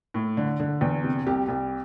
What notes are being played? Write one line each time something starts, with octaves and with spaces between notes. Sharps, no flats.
A2
D3
D3
E2
C3
C2 G4
C2